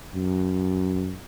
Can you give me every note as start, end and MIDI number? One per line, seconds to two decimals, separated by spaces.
0.15 1.16 42